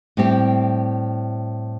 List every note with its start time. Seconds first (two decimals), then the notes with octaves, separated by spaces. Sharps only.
0.17 A2 G3 C4 G4